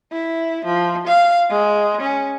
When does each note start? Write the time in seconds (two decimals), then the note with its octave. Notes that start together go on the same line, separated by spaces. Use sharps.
0.12 E4
0.65 F3
1.07 F5
1.50 G#3
2.01 C#4